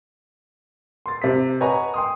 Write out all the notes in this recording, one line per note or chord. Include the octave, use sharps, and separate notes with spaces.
C6 A6
C3 B6
B4 C#5 D#5 F#5 G#5 A#5
G5 C6 D#6